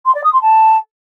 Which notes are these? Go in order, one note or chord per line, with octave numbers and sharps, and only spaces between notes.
C6
D5
D#6
C6
A5